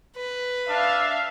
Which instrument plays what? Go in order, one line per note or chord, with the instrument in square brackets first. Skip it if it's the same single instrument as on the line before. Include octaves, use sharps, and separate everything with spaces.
[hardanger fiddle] B4
[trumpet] D4 [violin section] E5 F5